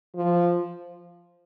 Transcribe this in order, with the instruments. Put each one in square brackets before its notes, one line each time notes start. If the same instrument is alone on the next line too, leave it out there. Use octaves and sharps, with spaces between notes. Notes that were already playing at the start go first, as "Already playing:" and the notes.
[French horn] F3